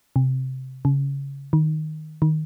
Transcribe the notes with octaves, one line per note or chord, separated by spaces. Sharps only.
C3
C#3
D#3
D#3